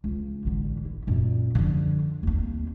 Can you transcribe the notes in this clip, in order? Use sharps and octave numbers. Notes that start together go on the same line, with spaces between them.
C#2
A1 D3
E4
F#2 A#2
D3 F3
D#2 C4